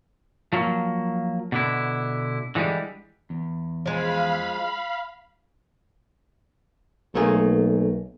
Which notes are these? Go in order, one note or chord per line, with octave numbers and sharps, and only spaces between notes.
F3 F#3 A#3
B2 D3 E4
D3 E3 F3 G3 G#3
E2
F3 G#3 F5 B5
B1 A3 A#3 G#4